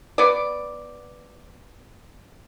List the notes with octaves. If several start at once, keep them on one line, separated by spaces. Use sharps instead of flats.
B3 D5